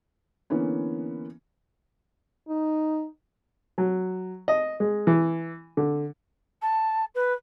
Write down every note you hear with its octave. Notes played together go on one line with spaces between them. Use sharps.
D3 E3 A#3 B3 C#4
D#4
F#3
D#5
G#3
E3
D3
A5
B4